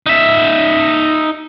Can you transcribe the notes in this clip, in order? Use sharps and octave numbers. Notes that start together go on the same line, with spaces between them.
D#4 E5